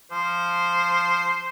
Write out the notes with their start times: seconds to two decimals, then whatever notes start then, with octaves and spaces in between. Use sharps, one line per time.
0.11 F3 C5